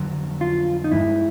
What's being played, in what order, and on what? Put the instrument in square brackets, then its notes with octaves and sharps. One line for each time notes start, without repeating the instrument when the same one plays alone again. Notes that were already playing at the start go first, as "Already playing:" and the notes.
Already playing: [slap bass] F2 D3 F#3
[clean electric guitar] F4
D#4
[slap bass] G2 E3 G#3 B3 [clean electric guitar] E4